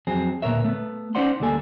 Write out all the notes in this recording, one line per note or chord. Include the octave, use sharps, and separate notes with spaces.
F2 F#3 C4 G#4
D2 A#2 B3 A#4 C#5 E5
A3 B3
C#4 D#4 C5 D5 F#5 C6
D2 G3 A#3 A4 G#5